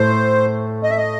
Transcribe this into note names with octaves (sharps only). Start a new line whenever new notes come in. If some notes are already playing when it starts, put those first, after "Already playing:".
Already playing: A2 A3 C5
D#5
E5
D#5